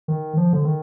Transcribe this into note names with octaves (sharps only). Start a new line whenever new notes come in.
D#3
F3
D3
D#3